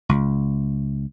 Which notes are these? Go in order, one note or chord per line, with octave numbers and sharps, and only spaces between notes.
C#2